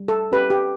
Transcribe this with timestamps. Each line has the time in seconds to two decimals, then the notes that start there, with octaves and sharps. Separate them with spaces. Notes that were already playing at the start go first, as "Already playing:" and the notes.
Already playing: G3
0.08 A4
0.32 C#4 G4 B4
0.50 G4